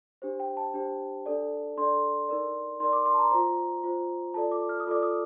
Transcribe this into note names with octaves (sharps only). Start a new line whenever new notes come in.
D4 G4 C5
G5
A5
D4 G4 C5
D4 A4 D5
D4 A4 D5 C6
D#4 A#4 D5
D#4 A#4 D5 C6
D6
C6
A5
A#5
F4 C5 A#5
F4 C5
F4 A4 D5 A5
D6
F6
D#6
F4 A4 D5 D6
D#6